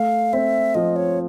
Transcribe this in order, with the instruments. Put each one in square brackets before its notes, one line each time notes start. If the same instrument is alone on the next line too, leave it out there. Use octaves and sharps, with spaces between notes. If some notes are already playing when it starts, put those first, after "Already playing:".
Already playing: [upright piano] A3 [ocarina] F5
[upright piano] C4 [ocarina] E5
[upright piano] F3 [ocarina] D#5
[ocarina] C#5